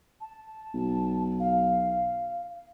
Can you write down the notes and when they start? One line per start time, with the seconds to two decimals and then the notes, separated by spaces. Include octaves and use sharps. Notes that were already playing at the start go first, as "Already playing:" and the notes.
0.21 A5
0.74 B1
1.40 F5